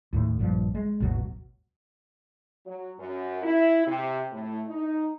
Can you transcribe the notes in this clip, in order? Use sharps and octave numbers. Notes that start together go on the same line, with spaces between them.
D#2 A2
A#1 G2 F3
G#3
G#1 D#2 B2 F#3
F#3
F#2
E4
C3
A2
D#4